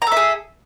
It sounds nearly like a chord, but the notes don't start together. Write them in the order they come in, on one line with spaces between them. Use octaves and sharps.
A#5 A4 E5 G#4